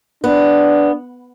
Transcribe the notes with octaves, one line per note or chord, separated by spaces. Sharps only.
B3 D4